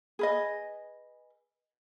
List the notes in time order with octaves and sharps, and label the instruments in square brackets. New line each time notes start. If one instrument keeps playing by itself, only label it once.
[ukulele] G#4 B4 D#5